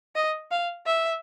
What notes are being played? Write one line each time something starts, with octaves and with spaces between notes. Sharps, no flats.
D#5
F5
E5